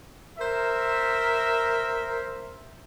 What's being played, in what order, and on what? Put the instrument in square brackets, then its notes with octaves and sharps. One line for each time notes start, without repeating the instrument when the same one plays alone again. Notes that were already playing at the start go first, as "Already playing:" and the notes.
[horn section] A#4 C5 E5